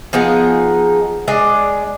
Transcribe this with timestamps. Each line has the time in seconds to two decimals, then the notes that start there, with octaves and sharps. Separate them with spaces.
0.13 F3 B3 D#4 G#4
1.28 G#3 D4 D5 D#5